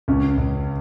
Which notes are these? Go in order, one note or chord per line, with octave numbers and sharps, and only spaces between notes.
C#2 C#4
C#2